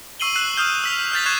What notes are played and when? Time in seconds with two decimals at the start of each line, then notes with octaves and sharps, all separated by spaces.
0.20 C#6 E6 C7 D#7 F#7 G7
0.35 E6 F#6 C7 E7 F#7
0.57 D#6 F6 G6 G7
0.84 E6 B6 F7
1.12 F6 G6 A6 B6
1.26 C#6 F#6 G#6 C7 E7